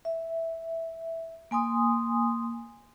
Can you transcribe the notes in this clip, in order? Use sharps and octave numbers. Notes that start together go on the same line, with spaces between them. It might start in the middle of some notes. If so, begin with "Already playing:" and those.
E5
A#3 G#5 C6 D#6